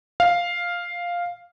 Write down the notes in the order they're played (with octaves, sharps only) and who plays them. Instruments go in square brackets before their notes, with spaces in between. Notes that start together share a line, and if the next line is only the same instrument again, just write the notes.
[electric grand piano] F5